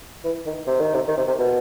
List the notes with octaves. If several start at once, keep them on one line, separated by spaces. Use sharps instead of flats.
E3
D#3
C3
D#3
C3
D#3
C3
C3
B2